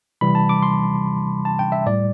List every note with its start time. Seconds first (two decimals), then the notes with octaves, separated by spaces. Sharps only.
0.21 C3 E3 G3 B5
0.35 A5
0.49 D6
0.63 C6
1.45 A5
1.59 G5
1.72 E5
1.86 A2 G3 D5